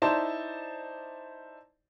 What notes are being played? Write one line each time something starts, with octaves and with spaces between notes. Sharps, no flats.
D#4 E4 C5 D5 A5